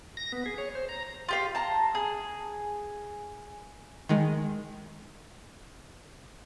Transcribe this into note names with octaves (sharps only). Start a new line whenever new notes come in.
A#6
B3
G#4
C#5
C5
A#5
F4 G4 F5
A5 A#5
G#4
D#3 G#3